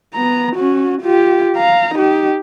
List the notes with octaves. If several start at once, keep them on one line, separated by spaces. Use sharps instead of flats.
B3 A#5
C#4 F#4
F4 G4
F5 A#5
D#4 G4